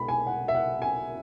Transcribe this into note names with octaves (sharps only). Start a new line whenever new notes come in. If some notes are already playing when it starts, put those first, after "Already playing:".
Already playing: B1 B2 G#3 B5
G#5
F#5
E5
F#5
G#5